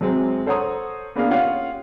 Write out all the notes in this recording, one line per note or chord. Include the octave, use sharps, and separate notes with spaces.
F#2 F#3 G#3 C4
A4 C5 C#5 F#5 A#5 D#6
A#3 B3 D4 G#4 A#4 F5
C#4 F4 G4 F5 F#5